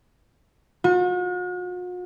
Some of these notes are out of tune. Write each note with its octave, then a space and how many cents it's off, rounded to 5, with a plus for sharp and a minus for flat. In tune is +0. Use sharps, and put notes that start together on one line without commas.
F#4 -45